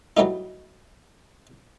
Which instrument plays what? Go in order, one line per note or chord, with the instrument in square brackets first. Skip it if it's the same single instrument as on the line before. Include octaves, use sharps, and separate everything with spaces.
[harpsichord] E3 F#3 G3 A3 D#4